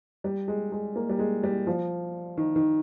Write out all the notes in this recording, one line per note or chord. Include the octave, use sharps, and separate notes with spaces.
G3
G#3
G#3
A#3
G3
G#3
G3
F3
D#3
D#3